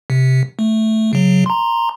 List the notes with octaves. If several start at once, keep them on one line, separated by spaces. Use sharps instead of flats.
C3
A3
C#3 F#3
A#5 C6